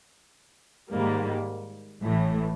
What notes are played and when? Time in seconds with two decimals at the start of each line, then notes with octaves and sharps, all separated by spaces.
0.91 G#2 D#3 G3 A#3
2.01 A1 A2 E3 A3